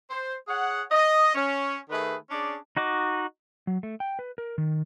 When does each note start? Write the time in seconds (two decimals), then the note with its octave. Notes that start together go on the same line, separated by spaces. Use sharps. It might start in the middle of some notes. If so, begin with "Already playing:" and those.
0.10 C5
0.47 G#4 C#5 F#5
0.92 D#5
1.35 C#4
1.90 D#3 A3 G#4 B4
2.30 C#4 D4 G#4 D5
2.77 D#4 F#4 D#5 D6
3.67 F#3
3.83 A3
4.00 G5
4.19 B4
4.38 A#4
4.58 D#3